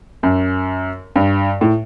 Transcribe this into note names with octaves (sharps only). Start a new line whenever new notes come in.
F#2
G2
A2